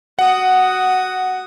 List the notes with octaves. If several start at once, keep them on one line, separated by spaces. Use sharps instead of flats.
F#4 F#5 D#6